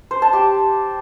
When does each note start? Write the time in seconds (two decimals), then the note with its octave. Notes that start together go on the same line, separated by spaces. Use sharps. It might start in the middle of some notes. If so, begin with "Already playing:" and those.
0.11 C5
0.22 A5
0.33 G4